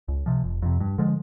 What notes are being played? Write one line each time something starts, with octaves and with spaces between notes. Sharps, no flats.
C#2
C3 F3
F1
F2 C3
G2
D3 F3 G#3